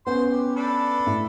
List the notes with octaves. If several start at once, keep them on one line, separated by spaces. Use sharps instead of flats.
B3 C#4 B4 C5 C6
G4
D4 A4 B5
A2